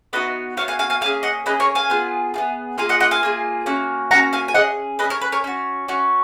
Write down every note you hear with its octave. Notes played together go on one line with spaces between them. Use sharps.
B3 D#4 F#4 B4 D#5
B3 D#4 F#4 C#5 F5
F5 G#5
F5 G#5
F5 G#5
A#3 C#4 G#4 F5 G#5
D#5 F#5
A#3 C#4 G#4 B4 D#5
A#4 C#5
F5 G#5
B3 F4 G#4
B3 F4 G#4
A#3 F4 G#4 F5 G#5
D#5 F#5
D#5 F#5
F5 G#5
A#3 F4 G#4
A#3 C#4 F#4
A#3 C#4 F#4 F#5 A#5
F5 G#5
G#5
C#4 G#4 D#5 F#5
C#4 G#4 B4 D#5
A#4 C#5
B4
A#4 C#5
C#4 F#4
C#4 F#4